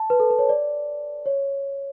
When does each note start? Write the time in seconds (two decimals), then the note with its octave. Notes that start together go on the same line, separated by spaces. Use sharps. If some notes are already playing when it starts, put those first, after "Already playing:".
Already playing: A5
0.10 B4
0.20 A4
0.30 B4
0.39 C#5
0.49 D5
1.26 C#5